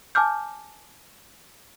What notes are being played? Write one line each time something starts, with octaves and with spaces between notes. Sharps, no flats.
G#5 A5 D6 F6 G6